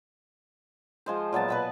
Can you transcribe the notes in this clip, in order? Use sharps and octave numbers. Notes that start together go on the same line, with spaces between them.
F3 G#3 C5
A#2 F#3 B3 A5
B2 B3 B4